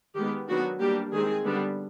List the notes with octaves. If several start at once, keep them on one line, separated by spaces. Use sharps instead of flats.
D#3 G#3 B3 G4
D#3 F#3 B3 D4 F#4
G3 A#3 D4 G4
D#3 G#3 C4 G#4
D3 G3 B3 D4